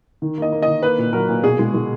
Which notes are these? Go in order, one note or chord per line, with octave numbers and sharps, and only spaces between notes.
D#3
A#3 D#5
A#3
D#3 D#5
A#3 B4
A#2
F#3 A#4
A#2
B2 G#4
G#3
G#3